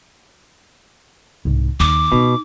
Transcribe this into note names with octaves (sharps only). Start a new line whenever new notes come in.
C2 G#2
D#2 D6
B2 D#4